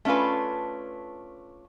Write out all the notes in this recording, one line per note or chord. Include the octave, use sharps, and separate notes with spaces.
A3 C#4 D4 F4 B4